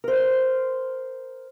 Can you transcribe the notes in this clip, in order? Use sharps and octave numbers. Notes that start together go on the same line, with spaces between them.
A#4 C5